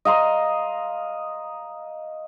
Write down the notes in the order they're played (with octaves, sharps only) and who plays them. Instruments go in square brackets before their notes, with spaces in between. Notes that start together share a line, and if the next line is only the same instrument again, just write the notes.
[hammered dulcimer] D#5 F5 A#5 C6